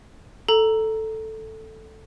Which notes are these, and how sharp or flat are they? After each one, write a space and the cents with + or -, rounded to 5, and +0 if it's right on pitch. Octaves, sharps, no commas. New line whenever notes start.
A4 +0 A#5 +0